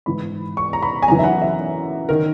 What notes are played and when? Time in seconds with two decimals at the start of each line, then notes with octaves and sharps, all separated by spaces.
0.06 G#2 E3 B5
0.57 C#6
0.73 A#5
0.83 B5
1.02 G#5
1.08 F#2 E3 A#5
1.19 E5
1.24 F#5
1.42 E5
2.09 D#3 A#4